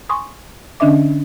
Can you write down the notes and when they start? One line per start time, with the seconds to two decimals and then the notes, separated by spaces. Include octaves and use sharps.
0.09 G#5 C6 C#6 D#6
0.80 D3 C#4 D4 D#5 E5 D6